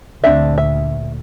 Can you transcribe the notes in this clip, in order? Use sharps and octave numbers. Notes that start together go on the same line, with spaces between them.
D2 A#2 C4 D4 E5
E5